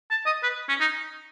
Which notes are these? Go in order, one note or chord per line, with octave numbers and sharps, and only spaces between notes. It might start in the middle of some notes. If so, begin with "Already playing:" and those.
A5
D#5
B4
C#4
D#4